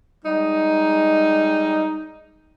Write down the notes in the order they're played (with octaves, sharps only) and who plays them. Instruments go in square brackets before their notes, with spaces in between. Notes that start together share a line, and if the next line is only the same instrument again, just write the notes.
[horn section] G3 G#3 D#4